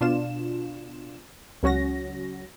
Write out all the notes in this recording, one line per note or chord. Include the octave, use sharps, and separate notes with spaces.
B2 D4 F4 E7
C#2 F#3 C#4 F#4 A#6